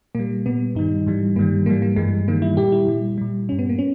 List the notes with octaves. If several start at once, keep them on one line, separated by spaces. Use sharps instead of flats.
A#2 G3 A#3
A#2 G3 B3
G2 D#3 G3 D#4
G#2 E3 G3
G2 D#3 G3 A#3
G#2 E3 G3 A#3
A#3
G2 E3 G3 G#3
G2 D#3 G3 A#3
E4
A#2 G3 G4
E4
A#2 G3
A#2 G3
G2 G3 C#4
B3
A#3
C#4